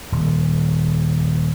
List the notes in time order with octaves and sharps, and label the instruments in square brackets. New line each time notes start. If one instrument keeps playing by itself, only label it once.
[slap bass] D#1